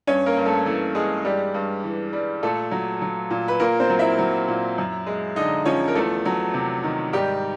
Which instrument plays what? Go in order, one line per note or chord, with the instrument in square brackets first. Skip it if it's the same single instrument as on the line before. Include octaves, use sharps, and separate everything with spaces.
[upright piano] G2 C#4 C#5
A#3 A#4
G2
A3 A4
E3 A3 A4
G#3 G#4
G2 G3 G4
G2
E3
G3
A#2 A3 A4
F#3
F#3
A#2
B4
A#2 A#3 A#4
C4 C5
F#3
E4 E5
F#3
A#2
F#2
G#3
D3 D#4 D#5
F3 C#4 C#5
A#4
E2 A3 A4
F#3
C3
D#3
G#2 G3 G4